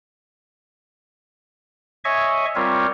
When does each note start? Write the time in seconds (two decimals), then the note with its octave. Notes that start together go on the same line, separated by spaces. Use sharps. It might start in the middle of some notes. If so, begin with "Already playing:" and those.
2.05 C#5 D#5 E5 G#5 C#6
2.55 G3 C4 F4 A#4 C#5